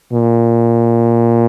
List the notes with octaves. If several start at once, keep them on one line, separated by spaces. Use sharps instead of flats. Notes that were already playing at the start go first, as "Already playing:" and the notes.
A#2